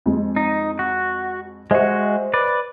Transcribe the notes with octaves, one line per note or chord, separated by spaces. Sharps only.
F2 G#3
D#4
F#4
G#3 F#4 C5 D#5 E5
B4 D5